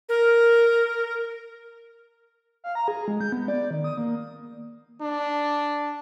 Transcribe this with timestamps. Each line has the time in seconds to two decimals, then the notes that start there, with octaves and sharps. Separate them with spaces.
0.09 A#4
2.64 F5
2.75 A#5
2.88 G#4
3.08 G#3
3.21 G6
3.32 B3
3.48 D5
3.71 D#3
3.84 D#6
3.97 A#3
5.01 D4